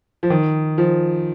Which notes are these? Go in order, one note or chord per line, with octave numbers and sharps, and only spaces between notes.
F3
D#3
F3